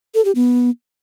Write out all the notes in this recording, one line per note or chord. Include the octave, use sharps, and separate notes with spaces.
A4
G4
B3